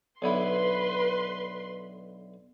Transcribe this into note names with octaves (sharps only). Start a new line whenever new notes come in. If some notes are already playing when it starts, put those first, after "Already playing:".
B1 D3 E4 B4 C6